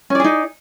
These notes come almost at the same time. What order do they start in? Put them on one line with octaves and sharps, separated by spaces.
C#4 D5 G#4 D#4